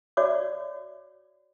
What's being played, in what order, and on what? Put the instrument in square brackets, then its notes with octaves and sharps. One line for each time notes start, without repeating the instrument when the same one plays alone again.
[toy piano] F#4 C#5 D5 E5 D6